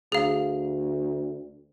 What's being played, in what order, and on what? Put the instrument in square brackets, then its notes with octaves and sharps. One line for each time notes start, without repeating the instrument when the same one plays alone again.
[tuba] D2 [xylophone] G#4 F5